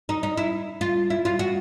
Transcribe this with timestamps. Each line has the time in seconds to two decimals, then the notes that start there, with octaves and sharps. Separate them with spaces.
0.09 D#4
0.23 D#4
0.37 E4
0.81 F4
1.10 E4
1.25 F4
1.39 F#4